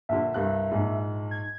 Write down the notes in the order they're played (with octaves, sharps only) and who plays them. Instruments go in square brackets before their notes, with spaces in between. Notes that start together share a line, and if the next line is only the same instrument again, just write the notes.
[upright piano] A#1 D3 [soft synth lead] E5
[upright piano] C2 G2 F#6
A#1 G#2
[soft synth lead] G#6